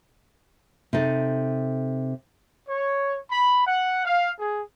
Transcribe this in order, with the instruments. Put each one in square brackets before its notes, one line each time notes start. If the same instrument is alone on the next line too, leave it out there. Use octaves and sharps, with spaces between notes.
[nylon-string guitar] C3 D#4 A4
[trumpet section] C#5
B5
F#5
F5
G#4